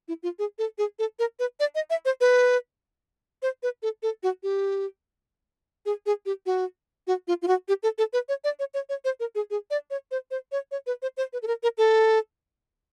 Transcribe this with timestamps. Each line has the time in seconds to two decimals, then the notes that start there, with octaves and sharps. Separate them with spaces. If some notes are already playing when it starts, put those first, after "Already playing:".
0.08 E4
0.23 F4
0.39 G#4
0.58 A4
0.78 G#4
0.99 A4
1.19 A#4
1.39 B4
1.60 D5
1.75 D#5
1.90 E5
2.05 C5
2.21 B4
3.42 C5
3.63 B4
3.83 A4
4.03 A4
4.23 F#4
4.43 G4
5.86 G#4
6.06 G#4
6.26 G4
6.46 F#4
7.07 F#4
7.28 F4
7.42 F4
7.48 F#4
7.68 G4
7.83 A4
7.98 A4
8.13 B4
8.29 C#5
8.44 D5
8.59 C#5
8.74 C#5
8.89 C#5
9.05 C5
9.20 A#4
9.35 G#4
9.51 G#4
9.70 D5
9.90 C#5
10.11 C5
10.31 C5
10.52 C#5
10.71 C#5
10.87 B4
11.02 C5
11.17 C5
11.33 B4
11.42 A4
11.47 A#4
11.63 A#4
11.78 A4